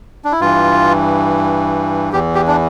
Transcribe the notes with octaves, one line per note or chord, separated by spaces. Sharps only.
D4
E4
G2 E3 F4
E2 E3 G4
G4
D4